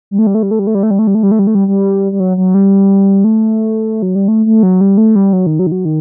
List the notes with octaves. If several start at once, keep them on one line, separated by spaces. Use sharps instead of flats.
G3
A3
G3
A3
G3
A3
G3
A3
G3
A3
G3
A3
G3
A3
G3
A3
G3
A3
G3
G3
G3
F#3
F#3
G3
A3
F#3
G3
A3
A3
F#3
G3
A3
G3
F#3
D#3
F#3
D#3
F#3
D#3